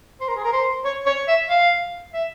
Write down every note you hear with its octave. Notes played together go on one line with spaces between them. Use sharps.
C5
A#4
G#4
A#4
C5
C#5
C#5
E5
F5
E5